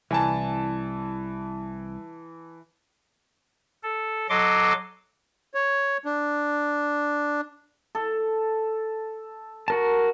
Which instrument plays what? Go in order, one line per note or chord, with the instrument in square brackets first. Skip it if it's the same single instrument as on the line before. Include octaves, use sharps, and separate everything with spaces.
[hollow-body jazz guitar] C2 G#5 [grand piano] E3 A5
[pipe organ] A4
F#3 A4 D#5 C6 D6
[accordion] C#5
D4
[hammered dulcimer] A4
[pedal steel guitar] F#4 A#4 A5